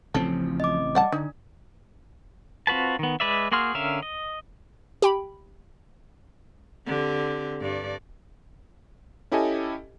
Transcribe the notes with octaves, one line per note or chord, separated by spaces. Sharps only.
A1 C#3 F3 C4 A4
D#5 D6
G3 D5 F#5 A5
D3 D4 D#4
C4 F4 F#4 B4 A5
D#3 B3
G#3 B4 D5 E5
A#3 F#4 G#4 C6 F6
D3 C#4 A#4 E5 F5
D#5
G4 G5 B5
D3 C4 G4
G2 D5
C#4 E4 G4 A4 D#5 G#5